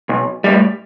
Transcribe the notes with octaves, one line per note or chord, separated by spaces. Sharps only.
B1
A2 G3